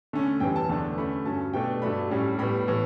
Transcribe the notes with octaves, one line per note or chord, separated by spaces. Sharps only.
D3 A3 C#4
F#2 E3 G3 G5
A5
E2 D3 A3 D4
D3 A3 C#4 B5
G2 F#3 C#4 A5
B2 A3 D4 G5
G2 F#3 A3 D4 B5
A2 G3 C#4
A2 G3 B3 B5
A2 E3 B3